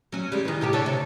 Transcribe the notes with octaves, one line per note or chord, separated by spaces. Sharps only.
F#3 C#4
G3 G#3
D#3 E3
A2 C3 G4
D3 A4 C#5
C3